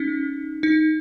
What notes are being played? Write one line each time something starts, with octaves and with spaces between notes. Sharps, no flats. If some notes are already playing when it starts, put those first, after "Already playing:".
Already playing: C#4 D#4
D#4